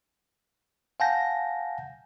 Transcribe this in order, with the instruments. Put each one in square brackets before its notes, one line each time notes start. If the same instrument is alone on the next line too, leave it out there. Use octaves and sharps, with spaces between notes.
[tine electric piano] F5 F#5 G#5 A5 G6 A#6